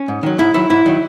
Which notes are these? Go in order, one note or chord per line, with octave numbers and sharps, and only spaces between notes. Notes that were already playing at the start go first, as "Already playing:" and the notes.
Already playing: C#4
G#2
D#3 F#3
G#2 E4
D#3 F#3 E4
G#2 E4
D#3 F#3